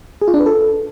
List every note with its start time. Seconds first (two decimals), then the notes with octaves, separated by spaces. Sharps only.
0.22 G#4
0.28 F4
0.34 D4
0.40 B4
0.46 A4